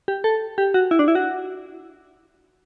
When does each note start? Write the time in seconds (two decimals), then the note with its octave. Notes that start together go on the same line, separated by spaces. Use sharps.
0.08 G4
0.24 A4
0.58 G4
0.74 F#4
0.91 E4
0.99 D4
1.08 E4
1.15 F#4